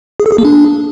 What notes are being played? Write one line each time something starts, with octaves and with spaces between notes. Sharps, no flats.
G#4
A4
G#4
A#3
D4